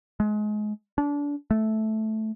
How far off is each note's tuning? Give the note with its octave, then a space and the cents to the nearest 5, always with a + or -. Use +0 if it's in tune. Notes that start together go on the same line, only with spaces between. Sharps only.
G#3 +30
D4 -25
A3 -10